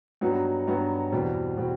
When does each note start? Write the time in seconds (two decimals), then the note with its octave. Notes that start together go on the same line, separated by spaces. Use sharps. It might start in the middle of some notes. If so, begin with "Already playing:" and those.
0.21 G2 F#3 B3 D#4 F#4
0.67 G2 F#3 B3 D#4 F#4
1.12 E2 B2 G3 C4
1.57 B2 G3 C4